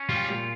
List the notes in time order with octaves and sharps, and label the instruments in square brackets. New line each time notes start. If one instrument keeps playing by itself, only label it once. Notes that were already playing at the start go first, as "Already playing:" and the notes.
Already playing: [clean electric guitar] C#4
[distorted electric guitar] G3 [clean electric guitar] F4
[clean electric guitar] A#2